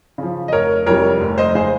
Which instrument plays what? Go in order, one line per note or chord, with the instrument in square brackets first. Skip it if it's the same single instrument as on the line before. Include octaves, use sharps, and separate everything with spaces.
[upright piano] C#3 F3
D#5
F1 A#4 C#5
F2 C3 G3 A#4 C#5
F1
C5 D#5
C#3 G#3 G#4 C5